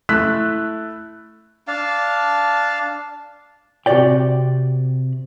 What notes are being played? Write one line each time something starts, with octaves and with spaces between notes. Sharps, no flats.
A3 E4 E6 F#6 B6
D4 F5 A5
C3 F#4 G4 C#5 D5 G5